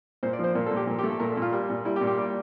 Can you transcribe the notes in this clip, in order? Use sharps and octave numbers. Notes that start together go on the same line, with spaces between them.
A#2 C5
D5
F3
C5
A#2 A#4
A4
A#2
G4
A#2
G4
A3
A4
A#2 A#4
A4
A#2 F4
G3
A#2
G3 E4
G4
A#2
G4
G3